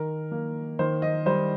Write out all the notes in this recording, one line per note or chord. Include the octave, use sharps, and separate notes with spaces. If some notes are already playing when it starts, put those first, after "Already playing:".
Already playing: D#3 A#4
A#3
D#3 C5
D#5
G3 C5